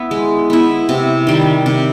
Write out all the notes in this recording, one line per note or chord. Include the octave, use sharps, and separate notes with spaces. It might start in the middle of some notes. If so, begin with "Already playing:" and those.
Already playing: B3 E4
G#3
B3 E4
C3
D#3 G3
C3